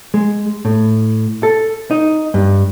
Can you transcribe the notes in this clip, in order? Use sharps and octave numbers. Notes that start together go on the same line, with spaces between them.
G#3
A2
A4
D#4
G2